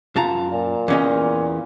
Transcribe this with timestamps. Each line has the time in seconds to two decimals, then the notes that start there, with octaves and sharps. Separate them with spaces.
0.16 F#2 F4 A5 A#5
0.52 A#2
0.88 E2 C#4 D#5